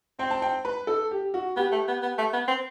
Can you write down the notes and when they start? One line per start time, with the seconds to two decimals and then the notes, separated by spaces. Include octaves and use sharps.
0.19 C4 G5
0.31 A5
0.42 G5
0.65 B4
0.87 A4
1.11 G4
1.34 F#4
1.57 B3 G4
1.72 A3
1.88 B3
2.02 B3
2.18 A3
2.33 B3
2.48 C4